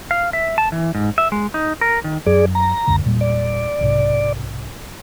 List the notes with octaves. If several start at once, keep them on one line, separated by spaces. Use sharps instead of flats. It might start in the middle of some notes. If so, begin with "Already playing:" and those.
F5
E5
A5
E3
G#2
E5
G#3
D#4
A#4
D#3
F#2 G#4 D5
A#5
C#2 F#2 D3
E1 A#2 G3
D5
B1 G#2 C3